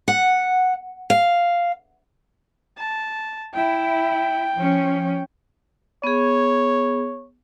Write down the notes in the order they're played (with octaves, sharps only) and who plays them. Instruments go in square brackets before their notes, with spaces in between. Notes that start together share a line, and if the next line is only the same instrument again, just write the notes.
[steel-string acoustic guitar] F#5
F5
[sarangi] A5
[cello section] E4 [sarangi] G5
[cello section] F3 C#4
[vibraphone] B3 G#4 [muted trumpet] C#5